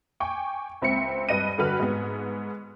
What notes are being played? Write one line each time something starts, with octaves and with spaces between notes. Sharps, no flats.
G5 G#5 C#6 D6
C#2 C4 E5 C#7
G2 B4 D#5 A#6 D#7
G2 D3 F#4 B4 F6
G#2 B3